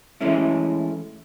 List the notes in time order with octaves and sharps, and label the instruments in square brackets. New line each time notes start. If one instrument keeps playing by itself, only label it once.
[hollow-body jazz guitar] E3 G#3 A3 C#4 E4